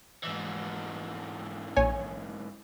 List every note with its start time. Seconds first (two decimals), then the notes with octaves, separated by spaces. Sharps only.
0.23 G#2 E3
1.76 A#1 C#5 G#5